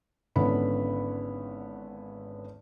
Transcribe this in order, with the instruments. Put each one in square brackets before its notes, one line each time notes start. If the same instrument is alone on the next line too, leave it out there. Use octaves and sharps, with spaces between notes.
[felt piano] G#1 D3 B3 C#4 E4 B5